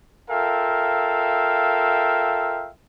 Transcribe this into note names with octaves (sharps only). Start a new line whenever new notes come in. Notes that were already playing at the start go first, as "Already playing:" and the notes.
F4 A4 A#4 E5 F5 G5